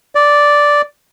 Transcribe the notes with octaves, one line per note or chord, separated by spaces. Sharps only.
D5